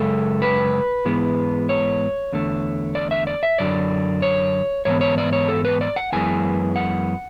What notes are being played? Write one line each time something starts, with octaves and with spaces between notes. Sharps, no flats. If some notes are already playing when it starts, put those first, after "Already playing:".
Already playing: F#2 C#3 G#3 A4
B4
G#2 E3 G#3 B3
C#5
E2 D3 A3
D5
E5
D5
E5
F#2 D3 F#3 D5
C#5
G#2 E3 B3 C#5
C#5
D5
C#5
A4
B4
D5
F#5
F#2 E3 G#3 B3 G#5
F#5